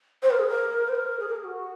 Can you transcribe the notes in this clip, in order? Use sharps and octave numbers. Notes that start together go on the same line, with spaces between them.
C5
A#4
G#4
A#4
C5
A#4
G#4
A#4
G#4
F#4